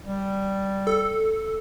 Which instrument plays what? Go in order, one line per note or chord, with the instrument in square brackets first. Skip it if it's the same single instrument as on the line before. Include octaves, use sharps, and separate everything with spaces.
[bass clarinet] G3
[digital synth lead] A4